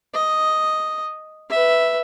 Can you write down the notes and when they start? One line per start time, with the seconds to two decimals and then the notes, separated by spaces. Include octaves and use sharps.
0.15 D#5
1.50 B4 E5